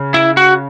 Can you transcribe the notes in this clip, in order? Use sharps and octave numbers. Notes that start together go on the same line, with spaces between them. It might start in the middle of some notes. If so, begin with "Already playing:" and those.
Already playing: C#3
E4
F#4